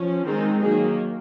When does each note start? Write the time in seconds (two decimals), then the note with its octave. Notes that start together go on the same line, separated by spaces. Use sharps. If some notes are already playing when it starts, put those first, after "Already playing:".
Already playing: F3 C#4
0.26 D#3 G#3 C4 D#4 G#4
0.62 D#3 F#3 A#3 G#4